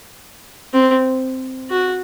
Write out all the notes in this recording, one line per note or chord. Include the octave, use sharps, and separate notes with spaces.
C4
F#4